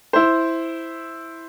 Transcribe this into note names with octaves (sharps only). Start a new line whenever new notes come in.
E4 C5